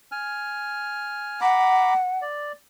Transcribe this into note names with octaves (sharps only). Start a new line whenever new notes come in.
G#5 F6
F#5 A#5 B5 D6
D5